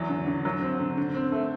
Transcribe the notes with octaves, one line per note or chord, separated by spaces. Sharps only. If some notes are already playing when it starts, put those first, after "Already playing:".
Already playing: E2 F#3
D3
D3
F#3
C4
D3
D3
C4
A3